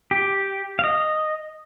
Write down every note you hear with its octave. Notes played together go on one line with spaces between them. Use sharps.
G4
F5
D#5